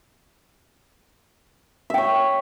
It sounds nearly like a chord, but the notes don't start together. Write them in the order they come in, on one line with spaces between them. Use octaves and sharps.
E5 G5 C#5